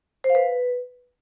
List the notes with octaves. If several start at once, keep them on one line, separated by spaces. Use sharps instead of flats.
C5
F5
B4